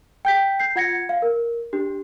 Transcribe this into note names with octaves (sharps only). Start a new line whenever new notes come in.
G5 G6 B6
G6 C7
F4 F#5 G#6 A#6 C#7
F5
A#4
D4 G4